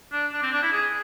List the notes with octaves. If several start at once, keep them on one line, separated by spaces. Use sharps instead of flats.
D4
D4
C4
D4
E4
G#4